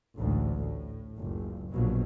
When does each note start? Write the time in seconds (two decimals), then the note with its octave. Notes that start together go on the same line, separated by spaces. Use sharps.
0.17 A1 D2 G#2
0.65 A2
1.17 F#1 C#2
1.71 A#1 B2 F#3